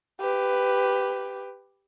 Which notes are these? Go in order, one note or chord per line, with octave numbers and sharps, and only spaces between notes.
G4 B4